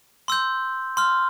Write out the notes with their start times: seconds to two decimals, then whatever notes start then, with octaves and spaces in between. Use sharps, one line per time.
0.28 C6 E6 G6
0.97 C6 F6